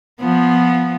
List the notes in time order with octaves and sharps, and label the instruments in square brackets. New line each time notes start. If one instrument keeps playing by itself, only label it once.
[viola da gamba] F3 B3